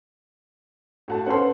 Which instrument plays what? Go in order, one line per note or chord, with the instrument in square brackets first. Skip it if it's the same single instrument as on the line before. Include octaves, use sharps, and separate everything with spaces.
[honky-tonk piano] A2 F#4 A5
[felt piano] C#4 B4 C6 [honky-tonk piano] A4 C5 F#5